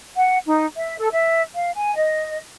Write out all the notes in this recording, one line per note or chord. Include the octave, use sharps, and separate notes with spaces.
F#5
D#4
E5
A4
E5
F5
G#5
D#5